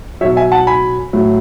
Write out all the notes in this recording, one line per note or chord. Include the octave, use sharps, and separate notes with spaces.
B2 F#3 C#5 E5
E5 G#5
F#5 A5
G#5 B5
A2 F#3